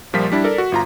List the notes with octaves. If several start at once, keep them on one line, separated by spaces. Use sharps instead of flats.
A#1 F3 G3 F4 A#4 B6
G3 D4 E4
A4 A#4 D5
F#4
G1 F4 A#5